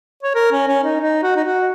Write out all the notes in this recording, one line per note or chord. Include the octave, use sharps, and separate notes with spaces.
C#5
A#4
C#4
C#4
D#4
D#4
F#4
D#4
F#4